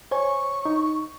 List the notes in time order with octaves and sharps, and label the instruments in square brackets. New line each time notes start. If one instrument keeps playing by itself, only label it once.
[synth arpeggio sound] C5 C#5 G#5 [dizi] C#6
[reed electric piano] D#4